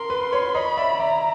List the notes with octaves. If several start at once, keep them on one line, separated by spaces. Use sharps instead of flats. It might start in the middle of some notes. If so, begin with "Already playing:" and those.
Already playing: A#4 C6
B4
B4 C#5
C#5 D#5 B5
D5 E5
D5 E5 A#5